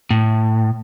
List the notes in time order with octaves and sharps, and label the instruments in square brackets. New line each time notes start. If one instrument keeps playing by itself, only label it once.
[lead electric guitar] A2